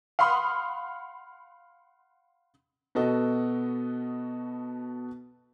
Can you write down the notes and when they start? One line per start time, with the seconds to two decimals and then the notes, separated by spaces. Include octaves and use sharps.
0.19 F5 F#5 B5 C6 D#6
2.95 B2 B3 F#4 A4 D#5